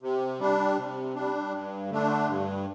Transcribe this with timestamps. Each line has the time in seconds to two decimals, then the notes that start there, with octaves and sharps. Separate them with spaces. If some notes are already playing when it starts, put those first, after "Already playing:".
0.02 C3
0.40 G3 D4
0.77 C3
1.15 G3 D4
1.53 G2
1.90 D3 A3 D4
2.28 G2